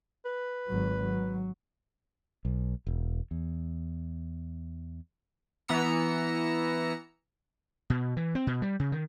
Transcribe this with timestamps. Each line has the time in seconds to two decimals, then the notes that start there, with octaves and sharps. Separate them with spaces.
0.25 B4
0.68 G#1 F#3
1.03 F#3
2.45 B1
2.87 E1
3.31 E2
5.68 E3 B3 A#5 E6 C#7
7.90 B2
8.17 E3
8.35 C4
8.47 B2
8.62 G3
8.80 C#3
8.92 D#3